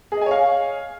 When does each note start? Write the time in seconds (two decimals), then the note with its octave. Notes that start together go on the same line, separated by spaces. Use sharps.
0.12 G#4
0.17 D#5
0.21 G#5
0.26 C#5
0.31 F5